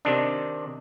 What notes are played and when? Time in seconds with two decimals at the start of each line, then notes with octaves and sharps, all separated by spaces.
0.05 C3 D#3 D4